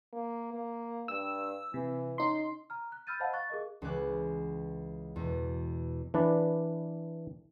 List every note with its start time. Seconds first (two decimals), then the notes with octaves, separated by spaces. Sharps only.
0.13 A#3
0.54 A#3
1.08 G2 E6
1.74 C3 E3
2.18 C#4 D#4 C6
2.70 A#5 F6
2.92 F#6
3.07 B5 E6 F6 G6 A6 D#7
3.20 C5 D#5 F5 F#5 A5 B5
3.33 F5 C#6 F#6 A6
3.50 G#4 A#4 D#5
3.82 C#2 E3 B4 G#5 D6 F#6
5.16 E2 B2
6.14 E3 D4 B4 D5